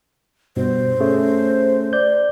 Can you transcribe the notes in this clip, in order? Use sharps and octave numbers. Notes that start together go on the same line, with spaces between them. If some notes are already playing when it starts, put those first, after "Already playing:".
G2 B2 C5
A3 C#4 G#4
D5 G6